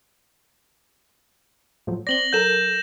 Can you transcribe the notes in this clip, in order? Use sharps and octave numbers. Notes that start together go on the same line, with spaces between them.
A2 F3 F#3
C4 D5 A#6 F#7 G7
F#3 A4 A#4 G6 E7